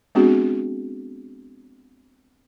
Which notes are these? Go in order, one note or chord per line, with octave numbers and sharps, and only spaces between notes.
G#3 B3 C4 D4 F#4 G#4